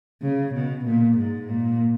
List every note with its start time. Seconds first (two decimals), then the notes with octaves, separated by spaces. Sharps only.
0.22 C#3
0.54 B2
0.85 A#2
1.17 G#2
1.49 A#2